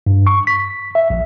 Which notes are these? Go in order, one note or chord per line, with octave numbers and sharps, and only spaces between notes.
G2
C#6
B6
E5
A#1